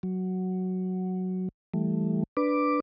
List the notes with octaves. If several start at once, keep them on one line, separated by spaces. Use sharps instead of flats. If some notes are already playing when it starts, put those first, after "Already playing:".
F#3
E3 G3 A3
D4 B4 D6